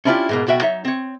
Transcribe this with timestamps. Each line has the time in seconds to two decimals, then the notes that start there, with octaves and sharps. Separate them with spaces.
0.05 C#4 D4 E4 F4 G4
0.29 G#2 B2 A#3
0.47 B1 B2 F#4 E5 G5
0.61 F#3 D#4 C#5 E5
0.85 C4 C#5